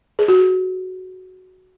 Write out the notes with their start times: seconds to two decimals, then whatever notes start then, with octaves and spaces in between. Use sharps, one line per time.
0.19 G#4
0.28 F#4